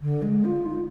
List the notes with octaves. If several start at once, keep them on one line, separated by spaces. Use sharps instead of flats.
D3
G#3
F4
D#4